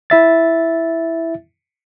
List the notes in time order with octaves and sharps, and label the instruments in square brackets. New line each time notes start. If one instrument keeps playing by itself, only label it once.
[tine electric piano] E4 E5 A6